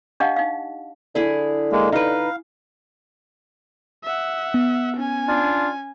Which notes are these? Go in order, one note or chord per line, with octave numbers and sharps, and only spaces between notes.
D4 G4 D#5 F5 F#5 A5
D#4 F5
D3 E4 G#4
G#3 A#3
D#4 B4 F5
E5 F#5
B3
C#4 G#5
D4 F4